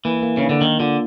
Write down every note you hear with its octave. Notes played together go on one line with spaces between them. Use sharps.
E3 A#3
A#3
C#3
D4
D3
D#3 A#3
D3 F4